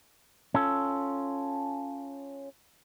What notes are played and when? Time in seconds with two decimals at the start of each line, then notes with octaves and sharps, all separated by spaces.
0.54 C#4 F4 A4